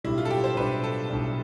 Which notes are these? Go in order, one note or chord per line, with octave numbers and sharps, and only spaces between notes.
B1 A2 G3 D4 E4
F4
A4
G4
C5
B1 A2 G3 D4 B4
A4
B1 A2 G3 D4